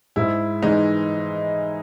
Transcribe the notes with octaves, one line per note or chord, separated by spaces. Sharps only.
G#2 E4
E3 G#3 D#4